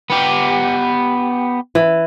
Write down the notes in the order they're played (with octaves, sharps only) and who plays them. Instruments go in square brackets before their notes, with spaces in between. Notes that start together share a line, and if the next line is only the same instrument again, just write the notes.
[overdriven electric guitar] B3 G4
[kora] E3